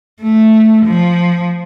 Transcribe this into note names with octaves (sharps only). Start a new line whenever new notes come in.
A3
F3